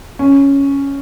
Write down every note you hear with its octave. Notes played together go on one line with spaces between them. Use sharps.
C#4